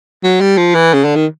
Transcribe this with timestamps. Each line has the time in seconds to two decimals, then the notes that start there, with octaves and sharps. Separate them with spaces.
0.24 F#3
0.41 G3
0.57 F3
0.75 E3
0.94 C#3
1.05 D3
1.16 D#3